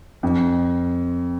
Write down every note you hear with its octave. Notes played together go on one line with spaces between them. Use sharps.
F2